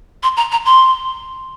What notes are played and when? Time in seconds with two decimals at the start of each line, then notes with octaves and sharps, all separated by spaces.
0.23 C6
0.37 A#5
0.52 A#5
0.66 C6